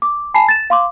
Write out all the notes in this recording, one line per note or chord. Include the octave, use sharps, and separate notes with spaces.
D6
G#5 A5 B5 C7
A6 E7
F5 C6 D6